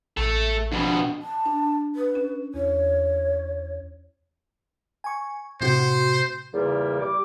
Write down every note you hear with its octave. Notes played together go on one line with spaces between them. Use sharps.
A1 A3 A4
F2 B2 D4
A5
D4
B4
C#4
E2 C#5
G#5 C#6
A2 C3 F#4 C5
E2 A#2 C#3 G3 A#3
G3 D6